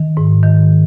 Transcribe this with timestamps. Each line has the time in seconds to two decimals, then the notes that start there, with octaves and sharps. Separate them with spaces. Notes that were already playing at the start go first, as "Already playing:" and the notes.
Already playing: D#3
0.17 G#2
0.43 D#3